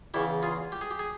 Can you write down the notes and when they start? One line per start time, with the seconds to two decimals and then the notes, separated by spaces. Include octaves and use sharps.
0.14 E2 C#3 E3 E4 G4
0.43 F4 G#4
0.72 G4
0.81 G#4
0.91 G4
0.99 G#4